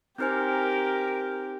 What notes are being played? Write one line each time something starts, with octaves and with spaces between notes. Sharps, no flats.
C4 D#4 G4 A#4 C5 G#5 F6 G6